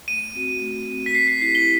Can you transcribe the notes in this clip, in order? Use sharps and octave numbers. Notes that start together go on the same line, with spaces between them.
A3 D#7
C4 F#4
A3
C4 F#4
B6
C4 C7
C7
E4 G4 C7
G7